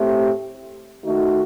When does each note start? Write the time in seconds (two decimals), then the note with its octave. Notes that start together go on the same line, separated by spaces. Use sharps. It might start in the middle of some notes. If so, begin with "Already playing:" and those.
Already playing: A2 A3 C4 G4
1.03 D#3 A3 D#4 F#4